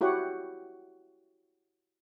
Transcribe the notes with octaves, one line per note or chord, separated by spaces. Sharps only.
E4 F#4 G4 C#5 F#5